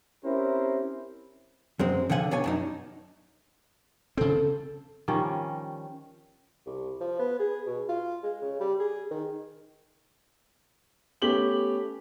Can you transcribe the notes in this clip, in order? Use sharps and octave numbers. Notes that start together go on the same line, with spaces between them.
C4 C#4 E4 G4 A#4 C5
F#2 G#3 C4
D3 D#3 F3 F#5 G#5
B2 D4 C#5 G#5
F#2 D4 D#4
C#3 C4 A4
D#3 F3 G3 C#4
C2
F3
B3
G#4
B2
F4
G#3
C#3
G3
G#4
D#3
A3 B3 C#4 G4 F#7 G7